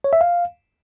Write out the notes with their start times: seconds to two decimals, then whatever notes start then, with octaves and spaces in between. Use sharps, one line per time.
0.04 C#5
0.13 E5
0.21 F5